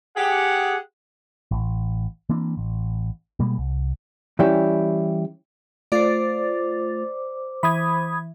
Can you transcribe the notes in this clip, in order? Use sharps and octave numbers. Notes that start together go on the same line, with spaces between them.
G4 G#4 F#5
A1
E3 A#3 C4 D4
A1
B2 G3 G#3 A#3
C2
E3 G3 C#4 E4 G4
A3 F4 C5 D5 D6 A6
E3 B5 D#6 G#6